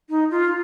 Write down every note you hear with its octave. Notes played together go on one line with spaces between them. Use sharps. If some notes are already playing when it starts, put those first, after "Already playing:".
D#4
F4